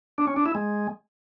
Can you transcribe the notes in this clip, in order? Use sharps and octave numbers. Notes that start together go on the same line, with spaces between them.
D4
C#4
D4
E4
G#3